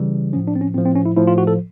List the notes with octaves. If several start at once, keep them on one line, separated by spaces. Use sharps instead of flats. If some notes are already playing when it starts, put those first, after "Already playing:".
Already playing: C#3 E3 G3
A2 F3 C#4
D4
C4
C#4
A2 F3 C4
C4
C#4
E4
A2 F3 E4
F4
F#4
A4